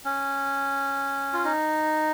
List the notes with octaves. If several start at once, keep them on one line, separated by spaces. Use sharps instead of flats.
C#4
F4
D#4